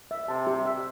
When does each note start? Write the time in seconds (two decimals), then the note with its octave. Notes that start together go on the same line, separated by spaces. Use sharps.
0.11 E5
0.28 C3 A5
0.47 G4
0.65 E5